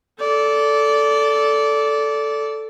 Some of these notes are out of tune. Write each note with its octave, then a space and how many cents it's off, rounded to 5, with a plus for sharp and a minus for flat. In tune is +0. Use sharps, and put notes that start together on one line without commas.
A4 +0 D5 -20